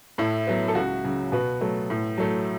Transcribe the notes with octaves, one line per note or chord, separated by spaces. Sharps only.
A2 E4
F#3 B3
A4
C#2 F#4
C#3 F#3
B2 F#4 B4
F#3 A3
A2
F#3 A3